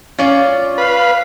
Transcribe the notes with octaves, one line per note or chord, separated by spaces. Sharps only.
C#4 F4 D5
B4 F5